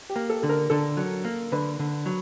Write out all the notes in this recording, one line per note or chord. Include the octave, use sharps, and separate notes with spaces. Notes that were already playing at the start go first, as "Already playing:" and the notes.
G4
A#3
A4
D3 A4
A#4
D3 A4
F#3
A#3
D3 B4
D3
F#3